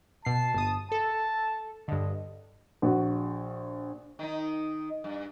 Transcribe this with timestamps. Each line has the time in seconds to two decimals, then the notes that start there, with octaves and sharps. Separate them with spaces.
0.25 B2 A5 C7
0.54 G1 D#6
0.92 A4 A5
1.88 G2 D3 D#5
2.82 A#1 F#4
4.19 D#3 D#4
5.04 G2